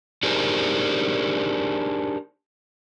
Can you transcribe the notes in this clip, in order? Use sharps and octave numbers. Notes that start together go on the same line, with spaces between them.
D4 D#4 G4 G#4 A#4 C5